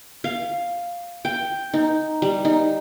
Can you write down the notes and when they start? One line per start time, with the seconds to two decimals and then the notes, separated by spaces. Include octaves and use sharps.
0.24 F5
1.25 G5
1.73 D#4
2.22 G3
2.45 D#4